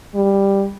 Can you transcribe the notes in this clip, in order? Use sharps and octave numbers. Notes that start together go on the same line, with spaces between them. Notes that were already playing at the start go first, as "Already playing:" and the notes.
G3